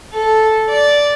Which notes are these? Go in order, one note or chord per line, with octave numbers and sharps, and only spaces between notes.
A4
D5